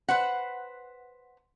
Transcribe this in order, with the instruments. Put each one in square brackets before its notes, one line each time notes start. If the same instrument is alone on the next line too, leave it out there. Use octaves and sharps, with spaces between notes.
[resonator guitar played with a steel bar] B4 C5 F#5